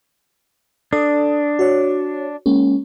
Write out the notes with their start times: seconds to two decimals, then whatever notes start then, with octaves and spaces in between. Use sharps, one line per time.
0.93 D4 A4 D#6
1.59 F#4 C#5
2.46 G#3 A#3 C#4